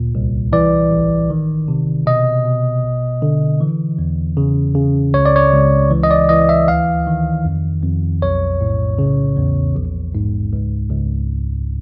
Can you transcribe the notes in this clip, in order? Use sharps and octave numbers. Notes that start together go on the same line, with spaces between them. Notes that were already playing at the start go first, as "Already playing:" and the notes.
Already playing: D2 A#2
C2
E3 D5
A1
D#3
C3
B2 D#5
B2
A1
D3
E3
E2
C#3
C#3
C#2 C#5
D5
C#5
C#2
E3
D#5
D5
E3 D#5
E5
D2 F5
D#3
F2
F2
B1 C#5
A2
C#3
E2
A#1
G#2
C#2
C#2